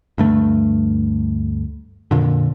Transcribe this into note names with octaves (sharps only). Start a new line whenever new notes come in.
D2 G2 A3
F2 A#2 D3